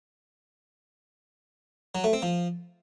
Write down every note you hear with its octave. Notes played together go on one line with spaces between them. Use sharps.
F#3
A3
C4
F3